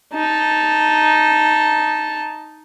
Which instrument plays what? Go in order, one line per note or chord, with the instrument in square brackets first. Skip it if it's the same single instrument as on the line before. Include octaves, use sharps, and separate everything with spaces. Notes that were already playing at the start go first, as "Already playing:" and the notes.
[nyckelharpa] D#4 A5